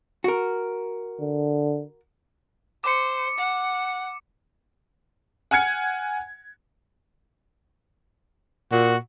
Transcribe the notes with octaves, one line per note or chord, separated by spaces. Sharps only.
F#4 A#4
D3
C5 D6 C#7
F#5
F#5 G#5 F6 G#6 C#7
A#2 F#4